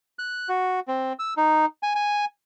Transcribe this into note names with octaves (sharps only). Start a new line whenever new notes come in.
F#6
F#4
C4
E6
D#4
G#5
G#5